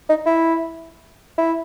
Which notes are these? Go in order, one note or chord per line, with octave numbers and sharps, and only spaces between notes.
D#4
E4
E4